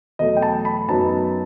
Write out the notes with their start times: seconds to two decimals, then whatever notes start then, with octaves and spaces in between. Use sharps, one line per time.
0.19 E2 B2 F#3 A3 D#5
0.37 G5
0.42 A5
0.65 B5
0.89 F#2 F#3 B3 D#4 A5